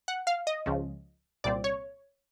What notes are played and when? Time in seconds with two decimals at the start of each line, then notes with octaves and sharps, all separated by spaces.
0.08 F#5
0.27 F5
0.47 D#5
0.66 C#2 C#3 F3
1.44 C2 A#2 G3 C4 D5
1.64 C#5